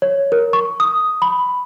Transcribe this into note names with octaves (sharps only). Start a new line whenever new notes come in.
C#5
A#4
C#6
D#6
B5